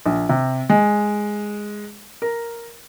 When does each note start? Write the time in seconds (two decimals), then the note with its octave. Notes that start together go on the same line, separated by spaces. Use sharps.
0.06 A#1
0.29 C3
0.70 G#3
2.22 A#4